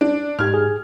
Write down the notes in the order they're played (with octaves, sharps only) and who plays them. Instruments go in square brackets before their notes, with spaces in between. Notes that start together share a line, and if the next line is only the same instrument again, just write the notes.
[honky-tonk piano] D4
[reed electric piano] G#2 D#4 G4 [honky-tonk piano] F6 G#6
[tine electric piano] G#4